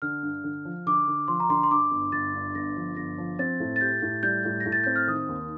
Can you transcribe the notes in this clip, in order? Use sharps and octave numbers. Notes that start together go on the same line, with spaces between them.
D3 F6
G2
D3
F3
D3 D6
D3
F3 C6
A#5
D3 C6
C6
G2 D6
G1
G1 A6
G2
G1 A#6
F3
G1 A#6
F3
C4 A6
A2
A6
G4 G6
A2
G3 G6
A2
A#6
A2
A6
C4 G6
F6
D#3 D#6
D#2